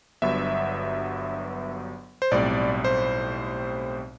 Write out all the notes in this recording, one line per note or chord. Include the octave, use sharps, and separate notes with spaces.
G1 G2 F#3 B3 E5
C5
B1 A2 G3 C4 D5
C5